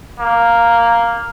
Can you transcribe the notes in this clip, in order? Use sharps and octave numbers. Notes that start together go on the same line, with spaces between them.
A#3